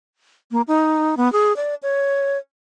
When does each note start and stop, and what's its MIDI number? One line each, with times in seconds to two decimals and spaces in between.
0.51 0.61 58
0.68 1.15 63
1.17 1.31 59
1.32 1.55 68
1.56 1.75 74
1.83 2.37 73